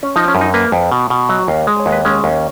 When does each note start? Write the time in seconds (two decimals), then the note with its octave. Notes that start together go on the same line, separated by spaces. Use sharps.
0.03 C#4
0.16 F3 D#4
0.28 C#4
0.35 F#2
0.41 D#4
0.54 A#3 B4
0.72 F2
0.91 B2
1.10 B2
1.29 F#3 D#5
1.48 D#2 F5
1.67 G#3 D#5
1.80 C#5
1.86 D#2
1.92 B4
2.05 G#3 C#4
2.24 D#2